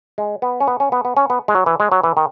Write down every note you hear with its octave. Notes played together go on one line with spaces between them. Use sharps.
G#3
B3
C#4
B3
C#4
B3
B3
C#4
B3
G#3
F#3
E3
G#3
F#3
E3
D#3